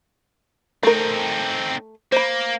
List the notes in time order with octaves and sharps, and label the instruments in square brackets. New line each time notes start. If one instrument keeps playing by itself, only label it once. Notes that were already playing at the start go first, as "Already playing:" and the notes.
[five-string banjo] A3 A#4 [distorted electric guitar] C4 D#4
[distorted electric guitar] A#3 [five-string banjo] C5 B5